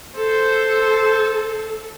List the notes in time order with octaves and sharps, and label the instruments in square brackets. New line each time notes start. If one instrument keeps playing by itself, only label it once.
[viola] A4 [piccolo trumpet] C5